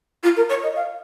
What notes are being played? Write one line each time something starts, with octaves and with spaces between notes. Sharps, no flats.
F4
A#4
C#5
D#5
F5